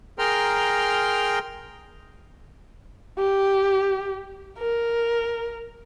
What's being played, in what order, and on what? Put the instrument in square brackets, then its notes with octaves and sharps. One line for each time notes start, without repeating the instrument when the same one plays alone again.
[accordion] G#4 A#4 G5 A#5 C6 F6
[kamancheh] G4
A#4